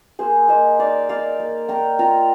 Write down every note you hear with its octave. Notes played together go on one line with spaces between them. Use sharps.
A#3 G#4 C5
A#3 C5 D#5
D#4 D5 F5
D#4 D5 F5
A#3
A#3 G5 A#5
F4 G5 A#5